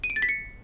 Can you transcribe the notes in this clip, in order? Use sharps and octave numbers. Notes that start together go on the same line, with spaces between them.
D#7
D7
A6
B6
C#7